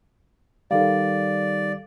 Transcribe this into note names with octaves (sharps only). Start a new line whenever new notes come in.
D#3 G3 A4 D5 F5